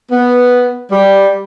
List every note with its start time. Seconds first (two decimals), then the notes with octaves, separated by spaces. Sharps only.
0.12 B3
0.92 G3